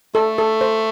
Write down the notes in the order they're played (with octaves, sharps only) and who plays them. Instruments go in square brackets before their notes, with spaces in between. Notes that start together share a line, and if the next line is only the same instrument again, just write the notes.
[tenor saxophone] A3 [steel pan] A4
[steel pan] A4
C5